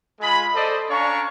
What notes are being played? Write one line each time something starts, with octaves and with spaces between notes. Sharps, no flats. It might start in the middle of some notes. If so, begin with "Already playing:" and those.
G#3 F4 G#4 B5
A4 C5 D5 D#5
C#4 D4 C#5 F5 A#5 C#6